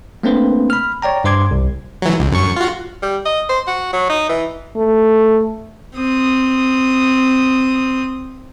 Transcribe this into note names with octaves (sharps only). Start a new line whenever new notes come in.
A3 A#3 C4 D4 B4 C5
B5 F6
C#5 D5 G5 A#5
G2 C5 C6 D6 G#6
C2
E3 F#3
C#2
F#2 C#6
F4 F#4
G3
D#5
C5
F#4
F#3
D#4
E3
A3
C4 D#6